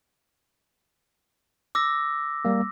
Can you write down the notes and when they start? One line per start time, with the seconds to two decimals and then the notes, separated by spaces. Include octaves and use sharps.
1.75 D6 E6 A#6
2.45 G3 A#3